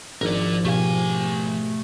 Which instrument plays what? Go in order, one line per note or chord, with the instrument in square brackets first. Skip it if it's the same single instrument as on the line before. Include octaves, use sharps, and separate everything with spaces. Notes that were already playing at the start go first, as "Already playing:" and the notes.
[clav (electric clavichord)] G#1 [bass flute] F3 [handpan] D4 D#4 [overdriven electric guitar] A#4 D5
[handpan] B2 G4 F5 [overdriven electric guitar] A3 G#5